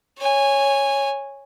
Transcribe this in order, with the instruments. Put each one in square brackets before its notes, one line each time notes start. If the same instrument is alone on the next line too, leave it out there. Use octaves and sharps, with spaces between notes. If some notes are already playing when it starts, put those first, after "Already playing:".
[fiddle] C#5 G#5